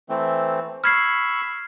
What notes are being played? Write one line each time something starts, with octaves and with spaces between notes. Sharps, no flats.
E3 A3 C4
B5 C#6 E6 F6 G#6 C7